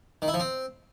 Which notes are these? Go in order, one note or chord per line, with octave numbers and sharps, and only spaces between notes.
D#3
E4
F3
C4